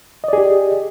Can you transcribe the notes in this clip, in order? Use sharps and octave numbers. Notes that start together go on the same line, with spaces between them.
G4 G#4 D5 D#5